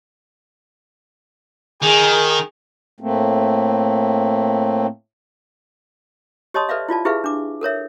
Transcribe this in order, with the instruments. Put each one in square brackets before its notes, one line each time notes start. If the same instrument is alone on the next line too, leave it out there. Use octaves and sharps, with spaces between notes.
[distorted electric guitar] D#3 [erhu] G#4
[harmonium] A2 A3 A#3 C4
[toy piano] G4 C#5 D#5 A5 C6 D#6
A4 B4 D5 E5 F5
E4 F4 D5 A5
E4 G4 G#4 B4 E5 F5
D4 D6
A4 A#4 C#5 E5